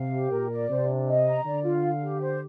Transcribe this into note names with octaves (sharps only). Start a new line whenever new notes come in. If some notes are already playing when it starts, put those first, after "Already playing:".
Already playing: C3 F5
G4
A#2 A#4
D5
C3 C5
D4
D#5
A#5
D3 D5
F4
F5
G4
C5